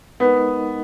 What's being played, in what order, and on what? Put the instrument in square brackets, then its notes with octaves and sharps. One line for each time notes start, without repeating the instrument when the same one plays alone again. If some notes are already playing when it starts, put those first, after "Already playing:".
[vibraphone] G#3 D#4 A#4 D#5 F#5 [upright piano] B3